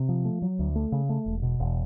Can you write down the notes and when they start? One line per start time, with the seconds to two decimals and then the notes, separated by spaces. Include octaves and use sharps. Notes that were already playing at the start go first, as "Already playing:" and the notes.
Already playing: C3
0.09 F3
0.25 A3
0.42 F#3
0.59 D2
0.76 A3
0.92 C#3
1.09 A3
1.26 E1
1.43 B2
1.60 E1